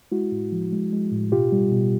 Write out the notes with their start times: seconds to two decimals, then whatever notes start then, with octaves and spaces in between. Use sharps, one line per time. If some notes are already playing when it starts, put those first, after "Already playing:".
0.12 G#3 E4 F#4
0.32 A2
0.52 F3
0.73 G#3
0.93 G#3
1.12 A2
1.32 B2 F4 G4
1.52 G3
1.72 B2